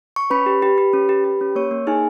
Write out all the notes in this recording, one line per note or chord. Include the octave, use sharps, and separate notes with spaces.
C#6
C#4 B4 B5
G4
G4
G4
C#4
G4
G4
C#4
A#3 C#5 C#6
A#3
D#4 G#4 G#5